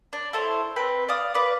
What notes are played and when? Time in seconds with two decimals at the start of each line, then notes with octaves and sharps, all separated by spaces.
0.13 D4
0.33 E4 A4 C5 C#5
0.76 C4 B4 G5
1.09 D5 F5 D#6
1.34 B4 D5